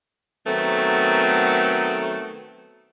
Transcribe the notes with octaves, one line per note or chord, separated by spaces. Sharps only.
D#3 F#3 A3 B3 C4